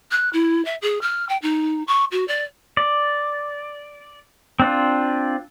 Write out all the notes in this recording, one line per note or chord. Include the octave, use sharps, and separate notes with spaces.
F#6
E4
E5
G#4
F6
G5
D#4
C#6
F#4
D5
D5
C4 D4 F4